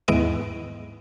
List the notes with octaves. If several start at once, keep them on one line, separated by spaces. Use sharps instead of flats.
D#2 G#2 B3 E4 D#5 D7